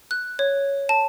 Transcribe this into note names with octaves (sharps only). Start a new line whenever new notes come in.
F#6
C#5
A5